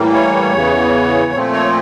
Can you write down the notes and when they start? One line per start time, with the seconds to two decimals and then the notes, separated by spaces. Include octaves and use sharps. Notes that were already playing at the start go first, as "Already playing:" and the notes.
Already playing: A2 E3 G3 A#3
0.13 C#5
0.53 E2 C#3 E3
1.32 A#2 F3 A3 C4
1.52 C#5